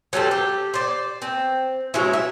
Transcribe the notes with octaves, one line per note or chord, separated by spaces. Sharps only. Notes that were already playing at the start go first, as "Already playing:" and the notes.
F#3 G3 C4 A4
G4
C5 D5
C4
F#3 G#3 C#4 E4
E5